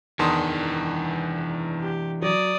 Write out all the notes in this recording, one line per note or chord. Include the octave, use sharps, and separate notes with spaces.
E2 D#3 E3 D4 A5 C6 D#6
G4
F#3 D5 D#6